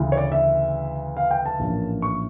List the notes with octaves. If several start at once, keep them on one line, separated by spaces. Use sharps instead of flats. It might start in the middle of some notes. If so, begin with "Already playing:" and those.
Already playing: D2 C#3 E3
C#5
D5
E5
F5
G5
A5
A#1 A2 E3 A#3 C#4
C#6